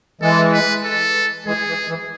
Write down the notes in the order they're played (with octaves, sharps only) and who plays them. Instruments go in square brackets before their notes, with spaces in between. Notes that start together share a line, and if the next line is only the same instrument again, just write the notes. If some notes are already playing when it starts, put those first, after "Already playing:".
[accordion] E3 G#3 [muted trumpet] A4
[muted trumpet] B4
A4
[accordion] E3 G#3 [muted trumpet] G#4
[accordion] E3
E3